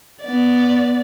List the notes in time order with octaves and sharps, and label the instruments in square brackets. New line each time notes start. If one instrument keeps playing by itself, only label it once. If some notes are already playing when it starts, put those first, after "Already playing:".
[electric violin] B3 D5